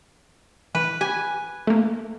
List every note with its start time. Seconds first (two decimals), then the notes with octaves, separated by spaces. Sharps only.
0.75 E3 B4
1.01 G4 G#5
1.67 A3 A#3